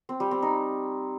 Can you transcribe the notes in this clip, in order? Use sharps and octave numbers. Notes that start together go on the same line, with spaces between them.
C4
G3
C4
D#4